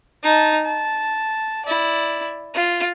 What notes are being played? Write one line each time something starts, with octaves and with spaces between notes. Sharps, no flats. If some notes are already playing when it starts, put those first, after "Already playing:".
D#4 A5
A5
E4 D5
F4